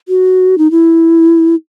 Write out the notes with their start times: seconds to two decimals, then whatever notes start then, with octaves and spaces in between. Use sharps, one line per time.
0.08 F#4
0.58 D#4
0.71 E4